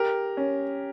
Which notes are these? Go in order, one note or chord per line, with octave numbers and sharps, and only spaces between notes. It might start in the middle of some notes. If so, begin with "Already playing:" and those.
Already playing: G4 A#4
C#4